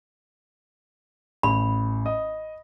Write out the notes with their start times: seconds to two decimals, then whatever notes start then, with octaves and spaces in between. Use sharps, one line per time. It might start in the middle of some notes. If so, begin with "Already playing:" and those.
1.43 A1 B5
2.06 D#5 D#6